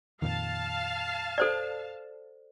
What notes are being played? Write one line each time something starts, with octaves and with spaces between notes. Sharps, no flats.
F2 A#2 D#3 F5 A5
A4 C5 D5